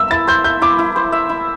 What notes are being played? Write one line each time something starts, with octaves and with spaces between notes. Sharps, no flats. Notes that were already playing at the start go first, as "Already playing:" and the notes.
Already playing: E5 E6
E4 A6
C5 G6
E5 G6
E4 D6
E4
C5
E5
E4